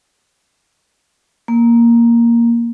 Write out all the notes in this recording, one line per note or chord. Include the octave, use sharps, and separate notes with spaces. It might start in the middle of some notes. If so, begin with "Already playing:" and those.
A#3